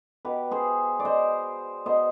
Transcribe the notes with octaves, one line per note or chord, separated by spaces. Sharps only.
B2 G4 B4
G#4 C5
D5
C5 D#5
B2 C5 D#5